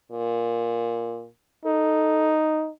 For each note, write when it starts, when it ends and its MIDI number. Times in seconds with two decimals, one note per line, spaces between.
0.11 1.26 46
1.65 2.70 63
1.65 2.37 69